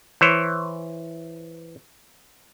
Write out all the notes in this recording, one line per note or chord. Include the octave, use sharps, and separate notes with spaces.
E3 C5 C#5